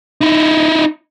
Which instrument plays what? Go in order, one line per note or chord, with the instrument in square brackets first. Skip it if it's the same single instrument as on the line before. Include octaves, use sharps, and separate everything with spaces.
[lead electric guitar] D#4 E4